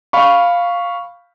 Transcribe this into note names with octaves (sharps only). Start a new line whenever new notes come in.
F5 B5 C#6